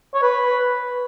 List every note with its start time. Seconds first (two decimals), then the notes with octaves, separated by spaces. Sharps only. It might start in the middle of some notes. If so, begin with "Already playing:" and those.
0.14 C#5
0.22 B4